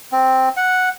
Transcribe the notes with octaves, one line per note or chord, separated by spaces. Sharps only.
C4
F#5